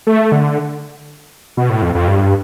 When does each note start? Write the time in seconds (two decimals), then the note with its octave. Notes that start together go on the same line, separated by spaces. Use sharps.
0.07 A3
0.32 D3
1.57 B2
1.70 A2
1.82 F2
1.95 F2
2.08 G2